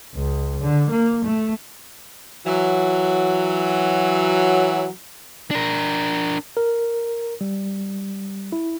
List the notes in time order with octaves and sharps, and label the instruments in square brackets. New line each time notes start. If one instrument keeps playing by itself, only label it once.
[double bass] C#2
D3
A#3
A3
[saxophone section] E3 F#3
[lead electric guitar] D4 A#4
[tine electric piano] A#4
G3
E4